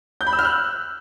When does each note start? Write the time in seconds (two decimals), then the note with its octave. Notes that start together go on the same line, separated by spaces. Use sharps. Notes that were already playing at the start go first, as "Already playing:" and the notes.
0.21 G6
0.27 B5
0.33 E6
0.39 F6
0.45 F#6